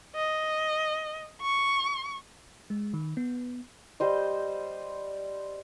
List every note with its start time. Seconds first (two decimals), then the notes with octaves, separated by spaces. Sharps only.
0.16 D#5
1.42 C#6
2.70 G#3
2.94 D#3
3.17 B3
4.00 G3 C5 D#5